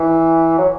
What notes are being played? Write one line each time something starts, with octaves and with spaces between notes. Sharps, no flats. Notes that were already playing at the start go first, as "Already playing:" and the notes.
Already playing: E3
F#3